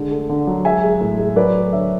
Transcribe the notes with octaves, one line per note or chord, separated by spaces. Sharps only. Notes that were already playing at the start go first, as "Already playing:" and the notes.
Already playing: D3 G#3
A3
D3
F#3
G#3 E5 G#5
G#3
A2
G#3
F#3 B4 D5
A3
D3 C#5 E5